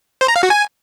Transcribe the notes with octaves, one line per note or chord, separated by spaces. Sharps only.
C5
A#5
F5
F#4
G#5